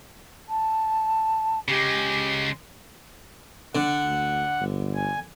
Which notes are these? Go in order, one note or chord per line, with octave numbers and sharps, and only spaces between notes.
A5
C#3 G#3 G4
D3 F#5
D2
G1
G#5